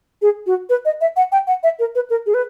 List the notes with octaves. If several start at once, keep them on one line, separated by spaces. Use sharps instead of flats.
G#4
F#4
B4
D#5
E5
F#5
G5
F#5
E5
A#4
B4
A#4
G#4
B4